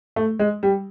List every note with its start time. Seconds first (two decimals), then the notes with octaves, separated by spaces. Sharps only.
0.16 A3
0.39 G#3
0.63 G3